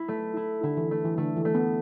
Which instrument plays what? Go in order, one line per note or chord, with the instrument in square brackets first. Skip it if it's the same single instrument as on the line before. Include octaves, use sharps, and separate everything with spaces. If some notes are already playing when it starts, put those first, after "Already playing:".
Already playing: [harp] E4
A3
E4
[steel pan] D3 [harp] E4
[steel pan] E3
[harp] A3
[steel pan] E3
[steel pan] D3 [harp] A3
[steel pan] E3
[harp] A3
[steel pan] B3